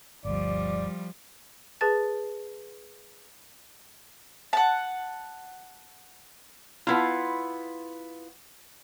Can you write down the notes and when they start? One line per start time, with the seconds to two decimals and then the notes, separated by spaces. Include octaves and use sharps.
0.25 G1 D2 F3 G3 D5
1.81 G#4 B4 A5 A6
4.53 F#5 A5
6.87 B3 E4 F4